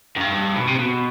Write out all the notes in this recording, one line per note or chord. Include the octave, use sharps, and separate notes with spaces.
F#2
G2
B2
C3
B2